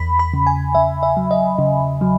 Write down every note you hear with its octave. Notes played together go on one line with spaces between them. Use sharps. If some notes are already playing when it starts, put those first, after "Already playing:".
Already playing: E2 B5
B5
C#3
G#5
C#3 E5
E5
F#3
D#5
C#3
F#3